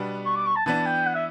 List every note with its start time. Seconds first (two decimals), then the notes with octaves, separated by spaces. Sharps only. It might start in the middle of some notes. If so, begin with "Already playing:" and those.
Already playing: B2 G3 B3 D4
0.26 C#6
0.36 D6
0.46 C#6
0.56 A5
0.66 E3 B3 D4 A5
0.86 G5
1.06 F#5
1.15 E5